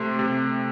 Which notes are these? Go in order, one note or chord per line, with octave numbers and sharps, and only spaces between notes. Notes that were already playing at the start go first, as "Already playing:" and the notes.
Already playing: C3 A3 C6
C3